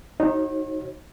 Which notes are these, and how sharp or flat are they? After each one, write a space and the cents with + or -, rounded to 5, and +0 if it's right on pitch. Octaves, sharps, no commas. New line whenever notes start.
D#4 +0 F#4 +0 C#5 -45